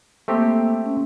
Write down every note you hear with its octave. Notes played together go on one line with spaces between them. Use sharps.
A3 A#3 C4 G4
C#4